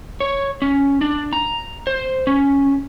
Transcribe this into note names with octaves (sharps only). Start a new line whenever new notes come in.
C#5
C#4
D4
A#5
C5
C#4